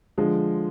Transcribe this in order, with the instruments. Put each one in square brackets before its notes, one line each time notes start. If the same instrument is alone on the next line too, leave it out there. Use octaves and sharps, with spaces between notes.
[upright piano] D3 F3 G#3